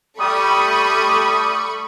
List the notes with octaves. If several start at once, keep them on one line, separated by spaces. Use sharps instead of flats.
G3 A3 B5 C#6 D#6